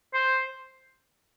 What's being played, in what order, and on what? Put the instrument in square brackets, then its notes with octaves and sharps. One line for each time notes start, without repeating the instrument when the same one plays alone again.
[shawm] C5